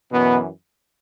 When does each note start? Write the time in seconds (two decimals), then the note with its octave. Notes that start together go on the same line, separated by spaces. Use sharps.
0.11 F#2 B2 E3 B3